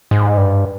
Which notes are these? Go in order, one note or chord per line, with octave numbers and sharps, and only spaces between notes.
G#2
G2